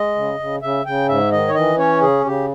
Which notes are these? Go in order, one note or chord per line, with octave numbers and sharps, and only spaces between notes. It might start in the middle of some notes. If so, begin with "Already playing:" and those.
Already playing: G#3 D#5
C#3
C#3
C#3 E5
C#3 G5
G#2 E5
D#3 D#5
C#5
E3 D#5
C#4 C#5
C#3 G#4
C#3 G4